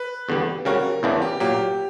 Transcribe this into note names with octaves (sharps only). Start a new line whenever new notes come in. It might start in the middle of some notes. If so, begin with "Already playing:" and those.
Already playing: B4
E2 D3 G3 B3
C#3 G3 C#4 F#4 A#4
E2 C#3 E3 B3 D4 A#4
G4
A#2 F#3 A#3 G4